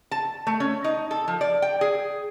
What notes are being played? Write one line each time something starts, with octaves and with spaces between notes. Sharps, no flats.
A5
A3
C#4
D#4
A4
F3
D5
G5
G#4